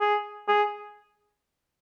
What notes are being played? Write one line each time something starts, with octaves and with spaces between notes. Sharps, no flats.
G#4
G#4